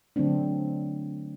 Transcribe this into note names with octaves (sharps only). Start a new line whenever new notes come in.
D3 F#3 A3 C4 D4